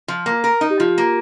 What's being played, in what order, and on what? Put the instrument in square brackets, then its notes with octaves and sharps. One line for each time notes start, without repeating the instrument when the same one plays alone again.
[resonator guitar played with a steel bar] F3
A#3
A#4
D#4
[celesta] G4
[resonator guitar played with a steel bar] F3 [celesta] F4
[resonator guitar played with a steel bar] A#3